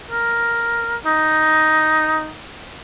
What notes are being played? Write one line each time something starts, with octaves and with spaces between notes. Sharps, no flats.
A#4
D#4